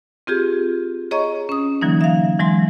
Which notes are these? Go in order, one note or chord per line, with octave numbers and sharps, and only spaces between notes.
C4 F4 G4 G#4
G#4 C#5 D#5 A#5 C#6
C#4 D#6
D3 E3 F#3 A#3 D#4
E5 F5
E3 F#3 G#3 C6